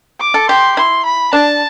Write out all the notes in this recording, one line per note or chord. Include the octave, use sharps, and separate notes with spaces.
D6
A4
G4 C6
E4 C6
B5
D4 A5